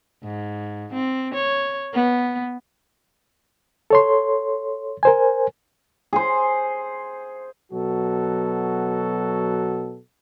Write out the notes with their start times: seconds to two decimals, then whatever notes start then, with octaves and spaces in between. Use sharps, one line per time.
0.23 G#2
0.93 C4
1.34 C#5
1.94 B3
3.90 A4 C#5 C6
5.03 A#4 C5 G#5
6.13 G#4 C5
7.72 B2 F#3 F#4 A4